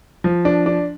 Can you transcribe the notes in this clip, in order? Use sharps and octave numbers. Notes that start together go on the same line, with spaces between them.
F3
D4
D4